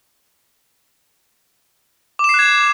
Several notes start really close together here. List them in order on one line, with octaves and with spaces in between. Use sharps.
D6 E7 C7 F#6 G#6